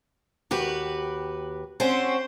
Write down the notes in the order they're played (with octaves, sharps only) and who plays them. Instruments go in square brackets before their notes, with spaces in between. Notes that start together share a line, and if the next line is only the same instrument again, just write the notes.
[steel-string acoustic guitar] D#2 F#4 B4 [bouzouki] G4
[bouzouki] C4 C#4 F#4 [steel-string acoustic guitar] C5